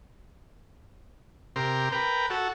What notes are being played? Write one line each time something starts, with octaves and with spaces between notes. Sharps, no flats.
C3 G4 A#4 C6
A#4 B4 G5
F#4 A4